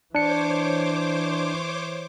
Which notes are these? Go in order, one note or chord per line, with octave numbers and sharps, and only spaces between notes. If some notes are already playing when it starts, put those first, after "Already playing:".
E3 D4 C5 C#5 D6 C#7